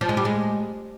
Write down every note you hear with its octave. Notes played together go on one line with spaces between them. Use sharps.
F3
G#3
G3
G#3